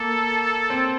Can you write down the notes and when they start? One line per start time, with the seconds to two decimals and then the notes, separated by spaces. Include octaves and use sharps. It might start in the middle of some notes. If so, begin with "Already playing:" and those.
Already playing: A#3 A4
0.70 C4